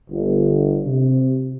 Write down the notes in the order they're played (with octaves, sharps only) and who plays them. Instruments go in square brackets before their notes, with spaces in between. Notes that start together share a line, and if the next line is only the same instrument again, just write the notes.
[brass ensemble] G1
C3